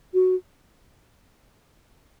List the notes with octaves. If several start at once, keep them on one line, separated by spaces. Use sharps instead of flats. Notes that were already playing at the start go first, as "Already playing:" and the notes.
F#4